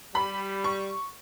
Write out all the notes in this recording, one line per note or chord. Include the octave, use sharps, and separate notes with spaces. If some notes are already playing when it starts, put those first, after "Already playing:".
G3 B5
C#6